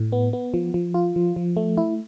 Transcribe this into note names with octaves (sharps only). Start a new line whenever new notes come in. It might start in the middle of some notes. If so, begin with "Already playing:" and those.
Already playing: A2
B3
B3
F3
F3
F4
F3
F3
A3
E4